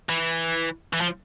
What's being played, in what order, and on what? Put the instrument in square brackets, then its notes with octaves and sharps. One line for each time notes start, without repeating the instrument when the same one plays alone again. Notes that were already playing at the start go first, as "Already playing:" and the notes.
[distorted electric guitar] E3
E3
F3